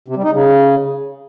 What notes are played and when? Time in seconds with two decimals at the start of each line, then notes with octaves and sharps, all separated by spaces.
0.08 C3
0.16 G3
0.24 D#4
0.32 C#3